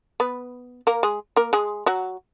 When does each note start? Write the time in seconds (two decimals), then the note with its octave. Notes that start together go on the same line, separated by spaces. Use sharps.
0.20 B3 B4
0.87 A#3 A#4
1.03 G#3 G#4
1.36 A#3 A#4
1.53 G#3 G#4
1.86 F#3 F#4